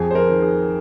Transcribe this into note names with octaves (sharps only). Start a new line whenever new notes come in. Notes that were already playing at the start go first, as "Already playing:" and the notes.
Already playing: F2 G#4
C5
A#4
D#3
G#4